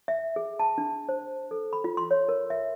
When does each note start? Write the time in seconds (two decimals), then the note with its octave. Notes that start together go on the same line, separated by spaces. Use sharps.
0.08 E5
0.36 G#4
0.59 A5
0.78 D4
1.09 C5
1.51 A4
1.73 B5
1.84 F4
1.97 C6
2.11 C#5
2.29 A#4
2.50 E5